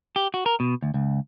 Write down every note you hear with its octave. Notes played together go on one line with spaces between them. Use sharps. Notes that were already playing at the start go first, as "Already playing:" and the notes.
G4
F#4
A#4
B2
D2
C#2